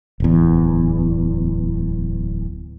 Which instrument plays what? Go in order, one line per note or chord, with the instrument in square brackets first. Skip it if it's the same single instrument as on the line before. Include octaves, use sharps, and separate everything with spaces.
[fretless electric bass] D1 E2